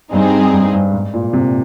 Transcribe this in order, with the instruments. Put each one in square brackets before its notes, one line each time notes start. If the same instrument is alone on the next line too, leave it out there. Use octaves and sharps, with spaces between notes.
[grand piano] G2 [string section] G3 C4 D#4 G#4
[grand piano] G2
G2
G#2
A#2
C3